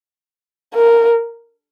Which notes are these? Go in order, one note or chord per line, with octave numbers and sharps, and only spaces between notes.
A#4